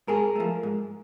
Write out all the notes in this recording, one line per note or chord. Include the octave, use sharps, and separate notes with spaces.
G#2 G#4 A#4
F3 A3
G#2